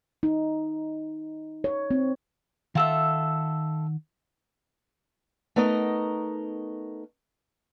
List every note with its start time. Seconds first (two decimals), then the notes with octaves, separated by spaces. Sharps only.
0.23 D#4
1.64 C#5
1.91 C4
2.75 D#3 F4 A4 E5 F#5
5.56 A3 B3 D#4 A#4 D#5